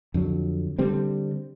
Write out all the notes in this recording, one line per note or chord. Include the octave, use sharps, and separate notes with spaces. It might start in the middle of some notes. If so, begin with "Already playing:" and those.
F2 D3 F#3
D3 G3 C4